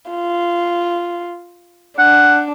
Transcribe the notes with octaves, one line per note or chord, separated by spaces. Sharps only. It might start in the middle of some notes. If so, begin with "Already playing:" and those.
F4
D4 F#5